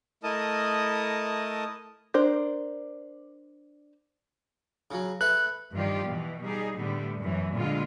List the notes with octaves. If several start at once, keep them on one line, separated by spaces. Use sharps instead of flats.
A3 E4 A#4 D#5 A5 D#6
D4 A#4 C5
C#3 F#3
A4 B4 E5 F#6
G2 D#3 F3 F4 G4 D5
B2 E3
G3 D#4 G#4
A2 D3 G3 A3 B3
F#2 E3
A#2 D3 G#3 B3 F4